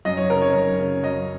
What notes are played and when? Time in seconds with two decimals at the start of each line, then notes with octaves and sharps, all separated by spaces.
0.05 F#2 D#5
0.17 C#5
0.30 C#3 A#4
0.42 C#5
0.54 F#2
0.79 C#3
1.03 F#2 D#5